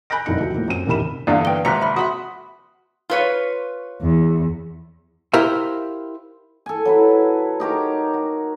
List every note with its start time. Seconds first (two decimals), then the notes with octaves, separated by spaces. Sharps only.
0.10 G#5 B5 F#6 G6 A#6 D7
0.26 F1 C2 F#2 D#4 C#7
0.40 D#2 C3 F3 F#3
0.54 A2 F3 A#3
0.68 F#2 C4 D#7
0.87 A1 D#2 C3 A#4 B5 E7
1.27 E2 G2 D3 D5 F5
1.45 B4 G5 G7
1.65 G#1 C3 A#5 F#6 B6 C#7
1.82 E5 B5
1.97 F#4 E5 B5 C6 D#6
3.10 F4 B4 C#5
4.01 E2
5.34 E4 G4 A#4 C5 E5 F5
6.66 A4 G#5
6.85 F#3 E4 B4
7.60 D#4 G4 A#4 C#5
8.14 F#4